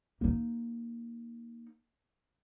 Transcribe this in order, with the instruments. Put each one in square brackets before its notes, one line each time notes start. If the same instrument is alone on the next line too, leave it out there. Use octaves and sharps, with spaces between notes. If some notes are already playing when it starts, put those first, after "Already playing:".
[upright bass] A#3 D#4